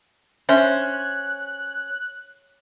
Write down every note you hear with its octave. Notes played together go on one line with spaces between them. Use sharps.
C#4 C5 E5 F#6